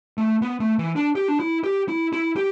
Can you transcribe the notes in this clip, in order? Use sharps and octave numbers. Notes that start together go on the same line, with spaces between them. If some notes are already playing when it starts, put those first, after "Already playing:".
A3
B3
A3
E3
D4
G4
D4
E4
G4
E4
E4
G4